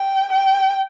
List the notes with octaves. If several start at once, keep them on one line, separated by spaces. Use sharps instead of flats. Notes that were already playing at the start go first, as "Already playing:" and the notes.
Already playing: G5
G5